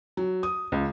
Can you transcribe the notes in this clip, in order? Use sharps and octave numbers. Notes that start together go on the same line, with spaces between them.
F#3
D#6
C#2